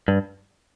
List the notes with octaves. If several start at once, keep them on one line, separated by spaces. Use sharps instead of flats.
G2